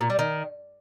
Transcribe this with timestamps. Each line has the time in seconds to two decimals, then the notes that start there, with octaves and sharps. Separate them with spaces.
0.01 A#2
0.10 G3
0.19 D#3